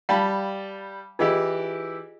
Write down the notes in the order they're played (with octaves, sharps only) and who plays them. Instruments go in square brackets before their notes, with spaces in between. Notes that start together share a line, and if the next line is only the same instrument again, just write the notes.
[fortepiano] G3 A5 B5 [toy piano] F5 G5
[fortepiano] E3 E4 G4 [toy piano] F4 G#4 D#5